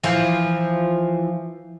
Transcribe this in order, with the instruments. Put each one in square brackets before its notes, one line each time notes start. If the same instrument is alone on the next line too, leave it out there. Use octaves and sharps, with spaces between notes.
[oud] E3 F3